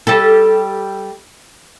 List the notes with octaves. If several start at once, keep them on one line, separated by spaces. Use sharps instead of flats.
G3 G4 A4